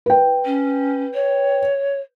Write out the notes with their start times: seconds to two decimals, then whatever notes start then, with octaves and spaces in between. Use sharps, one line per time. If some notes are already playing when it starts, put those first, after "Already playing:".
0.06 B4 G5
0.45 C#4
1.14 C#5